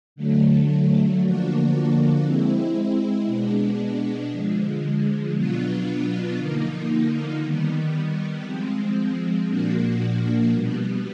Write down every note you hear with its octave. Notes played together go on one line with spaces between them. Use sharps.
D3 F#3 A3
D3 F3 A#3 D4 F#4
G#3 C4 E4
B2 G#3 B3 D4
D3 F3 G#3
B2 F#3 B3 D4 F4
D3 F3 A#3 D#4
D#3 G3 B3
F3 G#3 C4
A#2 F3 A#3 D4 F#4
B2 G3 B3